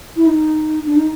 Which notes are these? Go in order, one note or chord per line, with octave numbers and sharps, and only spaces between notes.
E4
D#4
D4
D#4